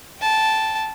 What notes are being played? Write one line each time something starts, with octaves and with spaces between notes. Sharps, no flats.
G5 A5